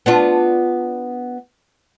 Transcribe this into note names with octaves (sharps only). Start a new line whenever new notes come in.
B3 D4 F4